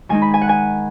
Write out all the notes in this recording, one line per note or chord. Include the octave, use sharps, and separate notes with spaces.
D#3 G#3 D#4 G#5
B5
G#5
F#5
G#5